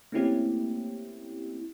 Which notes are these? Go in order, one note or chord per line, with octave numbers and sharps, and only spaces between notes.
A3 A#3 C4 C#4 E4 G4